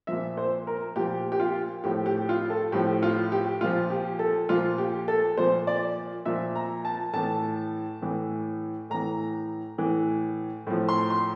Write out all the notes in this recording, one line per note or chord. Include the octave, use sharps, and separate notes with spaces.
A#2 F3 E5
C5
A#4
A#2 F3 G4
G4
F4
A2 F3 G4
G4
F4
A4
A2 F3 G4
F4
G4
A#2 F3 F4
G4
A4
A#2 F3 F4
G4
A4
A#2 F3 C5
D5
A#2 F3 E5
A#5
A5
A2 E3 A5
A2 E3
A2 E3 A#5
A2 E3
A2 F3
C6
C6